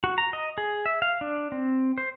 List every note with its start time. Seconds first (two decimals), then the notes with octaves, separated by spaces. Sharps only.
0.04 F#4
0.18 A#5
0.33 D#5
0.58 G#4
0.86 E5
1.02 F5
1.21 D4
1.52 C4
1.98 C5